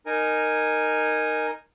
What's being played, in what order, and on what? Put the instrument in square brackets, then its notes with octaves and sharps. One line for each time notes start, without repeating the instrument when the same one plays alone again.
[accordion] D#4 A#4 G#5